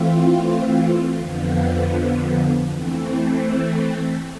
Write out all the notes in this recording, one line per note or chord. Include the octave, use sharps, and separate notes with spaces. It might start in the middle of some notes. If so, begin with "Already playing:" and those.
Already playing: E3 A3 C4 F4
F2 D3 F3 B3
E3 A3 C4